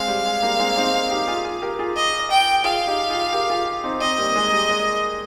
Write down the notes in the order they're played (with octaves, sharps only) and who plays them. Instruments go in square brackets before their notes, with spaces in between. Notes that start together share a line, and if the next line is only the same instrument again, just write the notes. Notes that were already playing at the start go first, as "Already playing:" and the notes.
Already playing: [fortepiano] G#3 C4 [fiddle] F5
[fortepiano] G3
G#3
G3 A#3
G#3 C4
C4 D#4
D#4 G4
F4 G#4
F4 G#4
G4 A#4
F4 G#4
[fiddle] D#5
G5
[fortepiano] F4 G#4 [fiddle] F5
[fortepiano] D#4 G4
F4 G#4
G4 A#4
F4 G#4
C4 D#4
[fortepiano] C4 D#4 [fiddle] D#5
[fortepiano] G3 A#3
G#3
G3
G#3